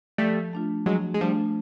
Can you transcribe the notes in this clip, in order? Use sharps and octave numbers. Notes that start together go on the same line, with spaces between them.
F3 G3 A3
A3 D4 F4
F3 F#3 G#3
G#3
F3 G3 A3 D4 F4